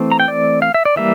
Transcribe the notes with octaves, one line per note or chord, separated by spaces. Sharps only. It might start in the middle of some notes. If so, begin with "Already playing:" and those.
Already playing: E3 A3 C4
A#5
G5
D5
F5
E5
D5
E3 G3 A#3 E5